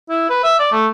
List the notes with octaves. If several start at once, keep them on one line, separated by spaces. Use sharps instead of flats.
E4
B4
E5
D5
A3